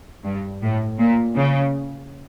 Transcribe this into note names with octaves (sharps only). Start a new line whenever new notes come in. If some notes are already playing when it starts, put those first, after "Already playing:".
G2
A2
A#2
C#3